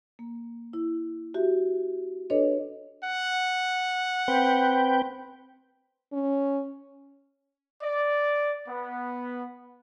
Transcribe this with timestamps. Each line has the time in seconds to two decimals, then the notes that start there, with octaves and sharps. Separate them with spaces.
0.19 A#3
0.73 E4
1.34 F#4 G4 E5
2.30 D4 A4 B4 C#5 D#5
3.04 F#5
4.28 C4 B4 G5
6.13 C#4
7.82 D5
8.67 B3